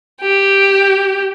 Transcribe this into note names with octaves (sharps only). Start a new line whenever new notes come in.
G4